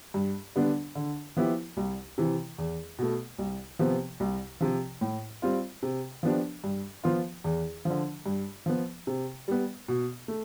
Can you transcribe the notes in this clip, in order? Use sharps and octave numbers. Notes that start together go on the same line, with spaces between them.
G2
D3 G3 B3 D4
D3
F3 B3 E4 G4
C2
C3 E3
E2
B2 A3
C2
C3 F3 B3
C2
C3 F3
A2
G3 C4 F4
C3
F3 B3 D4 G4
G2
F3 B3 F4
E2
F3
D3
G2
F3 B3
C3
G3 B3
B2
A3